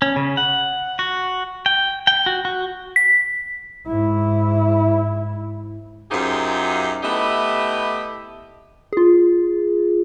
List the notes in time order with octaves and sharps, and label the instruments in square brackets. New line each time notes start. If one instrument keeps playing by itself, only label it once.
[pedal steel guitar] C#4
C#3
F#5
F#4
G5
G5
F#4
F#4
[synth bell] B6
[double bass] G#2 E4
[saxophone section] F#2 D#4 F4 G4 G#4 C5
A3 B3 E4 G4 D#5 E5
[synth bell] F4 G#4